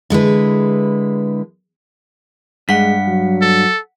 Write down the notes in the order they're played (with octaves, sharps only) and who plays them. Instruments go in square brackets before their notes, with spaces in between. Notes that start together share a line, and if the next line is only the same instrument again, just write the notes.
[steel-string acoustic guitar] D3 G#3 E4 B4
[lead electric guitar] G2 [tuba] G#3 [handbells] F#5 B6
[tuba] F#3
[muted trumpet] A4